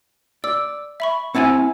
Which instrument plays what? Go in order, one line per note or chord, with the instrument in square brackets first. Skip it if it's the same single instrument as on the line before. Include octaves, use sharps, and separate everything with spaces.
[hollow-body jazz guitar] D5 [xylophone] E6
[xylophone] E5 B5 C#6
[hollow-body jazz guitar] C4 E4 A5 [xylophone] F#5 G#5